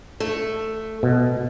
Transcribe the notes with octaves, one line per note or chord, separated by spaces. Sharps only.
A3
B2